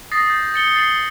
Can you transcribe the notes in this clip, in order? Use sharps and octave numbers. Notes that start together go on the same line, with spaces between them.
D#6 A6 A#6 C7
G6
A6 C#7 G7
A6 C7 F#7 G7